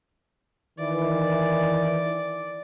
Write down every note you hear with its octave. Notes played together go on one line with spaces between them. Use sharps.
D#3 E3 D5